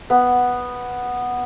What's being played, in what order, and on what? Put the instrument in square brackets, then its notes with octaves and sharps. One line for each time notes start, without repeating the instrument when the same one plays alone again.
[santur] B3